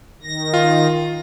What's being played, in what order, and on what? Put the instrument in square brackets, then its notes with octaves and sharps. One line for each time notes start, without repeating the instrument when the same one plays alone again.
[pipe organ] D#3 A#6
[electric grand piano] F4